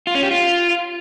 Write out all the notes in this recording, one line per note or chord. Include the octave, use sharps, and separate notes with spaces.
F4
C#4
G4
F4